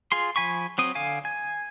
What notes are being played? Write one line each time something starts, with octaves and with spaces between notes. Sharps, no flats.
F4 G#4 C6
F3 G#5 B5 C#6
F#3 C4 D#6
D3 F5 G#5
G#5